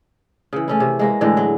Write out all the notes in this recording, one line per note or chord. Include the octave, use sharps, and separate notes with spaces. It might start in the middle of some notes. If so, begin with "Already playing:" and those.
C#3 E3
A3 C#4 E4
C3 C#5
G#3 A#3 B4
A2 D3 E3 G#3
F#3